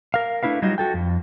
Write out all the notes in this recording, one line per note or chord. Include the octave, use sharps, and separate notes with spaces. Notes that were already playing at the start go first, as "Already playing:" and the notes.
A#4 F5
A3 D4 E4 B4 F5
F#3 G3 D#4 F4 F#4 D#5
F#4 A4 G5
F2